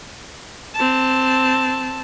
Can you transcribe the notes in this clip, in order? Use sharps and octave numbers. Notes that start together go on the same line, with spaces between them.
C4 A5